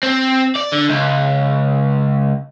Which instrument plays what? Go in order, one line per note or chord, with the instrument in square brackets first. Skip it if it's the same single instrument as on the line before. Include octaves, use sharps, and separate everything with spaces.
[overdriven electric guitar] C4
D5
D3
C#2